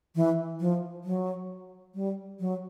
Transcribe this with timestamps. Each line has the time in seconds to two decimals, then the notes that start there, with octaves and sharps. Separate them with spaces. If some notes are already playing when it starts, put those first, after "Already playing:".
0.15 E3
0.60 F3
1.04 F#3
1.95 G3
2.40 F#3